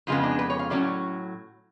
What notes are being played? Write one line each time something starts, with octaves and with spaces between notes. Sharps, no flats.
F2 C#3 G#3 B3 F4
D4
B4
C#5
F5
A2 F#3 C#4 D5